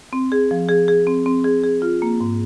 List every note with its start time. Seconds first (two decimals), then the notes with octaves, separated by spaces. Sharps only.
0.13 C4
0.32 G#4
0.51 F3
0.69 G#4
0.88 G#4
1.07 C4
1.26 C4
1.44 G#4
1.64 G#4
1.82 F4
2.02 A#3
2.21 G#2